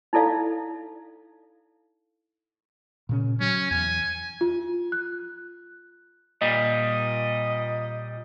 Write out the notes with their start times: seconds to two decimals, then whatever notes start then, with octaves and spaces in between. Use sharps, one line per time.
0.13 D#4 E4 A4 D5 F5
3.09 A#2 C#3 C#4
3.40 F#3 C#4
3.71 E2 G#5
4.41 F4
4.92 F#6
6.42 A#2 G3 D#5